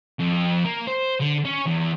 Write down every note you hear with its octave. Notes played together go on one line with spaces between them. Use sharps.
F2
A#3
C5
D3
C#4
E2